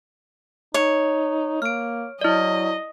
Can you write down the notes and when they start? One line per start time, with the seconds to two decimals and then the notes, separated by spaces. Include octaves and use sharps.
0.74 D#4 C#5
1.62 A#3 F6 D7
2.21 F#3 E4 D5 D#5